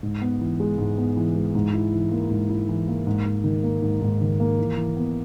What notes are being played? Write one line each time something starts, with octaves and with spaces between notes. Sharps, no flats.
G#2
B3
E3
G#3
G#2
B3
E3
G#3
G#2
E4
E3
A#3
G#2
E4
E3
A#3
G#2
G#2
D#3
A#3
G#2
G#2
D#3
A#3
E3
E3
B3